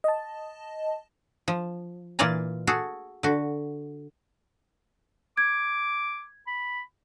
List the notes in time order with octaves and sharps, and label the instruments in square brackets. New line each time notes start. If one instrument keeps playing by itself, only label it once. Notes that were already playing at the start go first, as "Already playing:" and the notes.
[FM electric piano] D#5 A5
[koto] F3
A#2 E3 F4 D5 G#5 A#5
F#4 G#4 A4
D3 F#4
[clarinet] D6 [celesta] G#6
[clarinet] B5